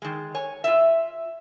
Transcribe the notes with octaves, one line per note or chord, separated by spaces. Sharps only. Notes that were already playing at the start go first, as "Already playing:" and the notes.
D#3 G#3
C#5 G#5
F4 E5